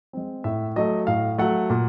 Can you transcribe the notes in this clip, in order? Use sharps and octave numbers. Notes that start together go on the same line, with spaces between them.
G#3 C4
A2 E5
F#3 A3 D#5
A2 F5
F#3 A3 F#5
A#2